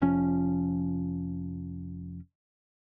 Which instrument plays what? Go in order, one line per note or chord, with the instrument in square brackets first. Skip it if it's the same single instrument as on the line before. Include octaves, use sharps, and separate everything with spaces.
[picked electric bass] F1 F3 C#4